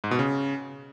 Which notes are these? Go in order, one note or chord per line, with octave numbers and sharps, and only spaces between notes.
G#2
B2
C#3